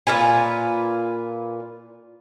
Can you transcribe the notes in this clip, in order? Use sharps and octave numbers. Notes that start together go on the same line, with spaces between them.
A#2 F4 B4 G#5